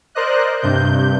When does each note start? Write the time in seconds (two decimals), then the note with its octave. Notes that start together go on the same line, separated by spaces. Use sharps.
0.15 A#4 C5 D5 D#5 F#6
0.61 G2 C3 G6